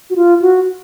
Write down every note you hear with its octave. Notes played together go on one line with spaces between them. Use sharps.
F#4
F4
F#4